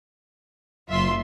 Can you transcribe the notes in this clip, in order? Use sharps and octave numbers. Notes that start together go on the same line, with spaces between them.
F#1 F#2 F4 E5 C6